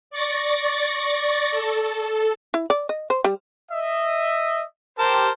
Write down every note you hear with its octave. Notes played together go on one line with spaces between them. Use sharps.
D5 C#6 A6 A#6
A4
E4
D5
D#5
C5
G3
D#5 E5
G4 A#4 C5 A5